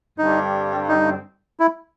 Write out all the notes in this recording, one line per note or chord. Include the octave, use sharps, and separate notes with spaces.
G2 D3 G3 C4 D#4
D#4
E4